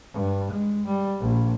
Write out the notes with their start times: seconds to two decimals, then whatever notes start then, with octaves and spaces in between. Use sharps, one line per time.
0.13 G2
0.51 G#3
0.86 G3
1.21 A#1